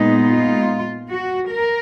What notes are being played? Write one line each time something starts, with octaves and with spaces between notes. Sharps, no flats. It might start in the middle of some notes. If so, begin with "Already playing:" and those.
Already playing: A#2 G#3 B3 D#4
F4
F#4
A#4